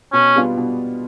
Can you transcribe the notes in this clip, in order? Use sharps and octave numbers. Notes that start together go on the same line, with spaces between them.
B2 C#4
G3 B3 D4 F4
B2